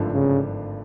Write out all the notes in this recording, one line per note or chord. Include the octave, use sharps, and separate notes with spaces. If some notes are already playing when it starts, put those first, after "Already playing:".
Already playing: G#1 G2 D3 F3 A3
C#3